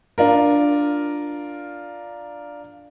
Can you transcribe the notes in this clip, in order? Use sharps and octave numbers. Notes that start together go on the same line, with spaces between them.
D4 F4 A#4